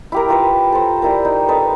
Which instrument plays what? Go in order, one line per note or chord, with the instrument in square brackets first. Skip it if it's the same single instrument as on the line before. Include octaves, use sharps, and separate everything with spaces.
[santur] E4 G4 A#4
F4 A#4 B4
A4 C5
G3 E4 A#4
D#4
A4 B4 D#5